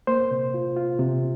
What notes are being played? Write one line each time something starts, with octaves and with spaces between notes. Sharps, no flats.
A#3 C5
C3
F4
F4
C3